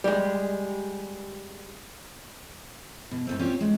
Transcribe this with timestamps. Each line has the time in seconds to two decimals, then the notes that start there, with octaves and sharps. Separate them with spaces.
0.04 G3 G#3
3.11 B2
3.27 G#2 A3 C4
3.39 C4 C#4 F4 G4 C#5 D5
3.61 G#3